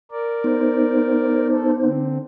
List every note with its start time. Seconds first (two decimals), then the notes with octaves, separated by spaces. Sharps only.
0.11 A#4 D5
0.44 B3 D#4 C5
1.51 A4
1.82 D3 C4